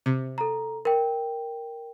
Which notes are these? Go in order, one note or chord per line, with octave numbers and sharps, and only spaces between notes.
C3
A4 A#5
A#4 G5